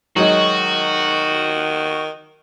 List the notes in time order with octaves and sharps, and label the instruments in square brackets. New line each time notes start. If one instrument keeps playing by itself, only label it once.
[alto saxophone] D#3 [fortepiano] F#3 G#3 D#4 [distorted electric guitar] F#4